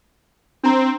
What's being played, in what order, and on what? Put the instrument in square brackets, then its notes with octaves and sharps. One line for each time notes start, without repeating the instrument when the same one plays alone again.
[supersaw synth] C4 [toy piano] D4 A#5